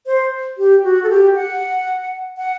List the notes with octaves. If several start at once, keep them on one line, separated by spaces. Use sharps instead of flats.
C5
G4
F#4
A4
G4
F#5
F#5